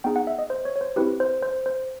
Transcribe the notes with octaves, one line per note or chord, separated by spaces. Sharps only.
B3 D#4 G#4 G5
F#5
E5
D#5
C5
C#5
C#5
C5
C4 E4 G4 B4
C5
C5
C5